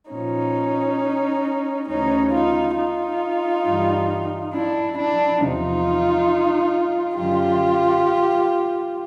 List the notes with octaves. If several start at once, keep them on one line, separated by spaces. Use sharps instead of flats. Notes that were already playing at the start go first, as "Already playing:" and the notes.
A#2 F3 C#4 D#4
D2 C#3 E3 C#4 D#4
D#4 F4
D#4 F4
G2 E3 G3
D4 E4
D4 E4
E2 C3 F3 D#4 F4
F#2 D3 F#3 F4 G4